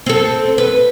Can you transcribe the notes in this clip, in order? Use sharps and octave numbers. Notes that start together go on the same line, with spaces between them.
C4 A4
B4